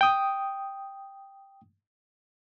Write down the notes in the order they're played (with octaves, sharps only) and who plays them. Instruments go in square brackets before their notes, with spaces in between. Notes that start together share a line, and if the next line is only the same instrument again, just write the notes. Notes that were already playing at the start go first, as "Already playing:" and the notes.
[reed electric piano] G5 D#6